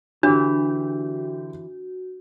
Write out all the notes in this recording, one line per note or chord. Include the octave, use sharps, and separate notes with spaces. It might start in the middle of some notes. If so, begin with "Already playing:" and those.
D3 E3 D4 F#4 G4